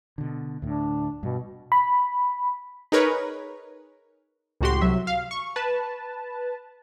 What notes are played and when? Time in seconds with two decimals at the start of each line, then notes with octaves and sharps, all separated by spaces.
0.18 B2 D3
0.62 D2 A2 D4
1.23 G2 B2
1.72 B5
2.92 D#4 G#4 A#4 B4 C#5
4.61 C#2 A2 F#4 G4 C6
4.82 C2 F#3 E5
5.07 F5
5.31 C#6
5.56 B4 A5